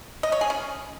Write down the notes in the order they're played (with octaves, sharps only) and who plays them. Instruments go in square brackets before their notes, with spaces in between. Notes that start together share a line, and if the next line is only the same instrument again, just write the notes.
[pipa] D#5
C#5
G#4
C#4